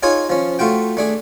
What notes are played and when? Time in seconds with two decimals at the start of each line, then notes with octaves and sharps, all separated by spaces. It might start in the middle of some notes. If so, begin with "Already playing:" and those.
0.03 D#4 F4 G#4 C#5 G#5
0.30 F3 C#4
0.59 A3 F4 F#4 G5
0.97 A3 D4 G#4